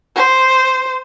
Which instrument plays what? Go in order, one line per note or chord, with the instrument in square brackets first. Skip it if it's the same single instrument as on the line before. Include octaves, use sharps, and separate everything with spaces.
[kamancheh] C5